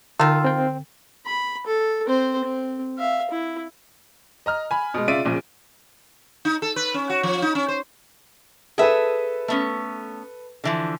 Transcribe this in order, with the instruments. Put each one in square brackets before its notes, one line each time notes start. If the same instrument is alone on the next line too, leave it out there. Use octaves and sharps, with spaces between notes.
[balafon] D3 [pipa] D#3 F4 [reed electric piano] E6
[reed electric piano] C4 G5
[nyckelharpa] B5
A4
C4 C5
C4
E5 F5
E4
[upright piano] D#5 A#5 F6
G#5 B5
B2 G#3
C#3 F4 D5 E5 D7 D#7
A#1 A#2 C#3
[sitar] D#4
A4
B4
C#4
F#4
F3
D#4
C#4
C5
[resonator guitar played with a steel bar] G#4 E5 [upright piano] A4 B4 A5
[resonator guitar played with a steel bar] A3 B3 C#4
D3 E3 F3